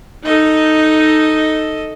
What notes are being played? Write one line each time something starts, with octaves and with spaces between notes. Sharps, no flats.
D#4 A4 D#5